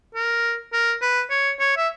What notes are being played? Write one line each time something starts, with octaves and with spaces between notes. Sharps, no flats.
A#4
A#4
B4
C#5
C#5
E5